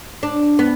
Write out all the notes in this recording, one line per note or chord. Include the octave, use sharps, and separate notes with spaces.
D4
B3